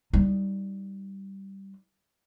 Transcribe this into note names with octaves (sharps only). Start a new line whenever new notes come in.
G3 D#4